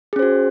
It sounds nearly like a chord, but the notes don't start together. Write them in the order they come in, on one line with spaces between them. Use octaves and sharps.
G#4 C#4 C5 F#4